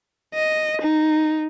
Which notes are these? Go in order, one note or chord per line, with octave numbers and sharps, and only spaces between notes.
D#5
D#4